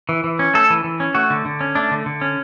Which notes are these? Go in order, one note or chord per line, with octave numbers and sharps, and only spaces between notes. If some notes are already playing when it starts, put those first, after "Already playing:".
E3
E3
C#4
A3 A4
E3
E3
C#4
A3 F#4
D3
D3
C#4
A3 D4
D3
D3
C#4